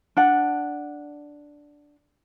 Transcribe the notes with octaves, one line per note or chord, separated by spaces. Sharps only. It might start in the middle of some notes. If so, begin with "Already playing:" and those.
D4 F#5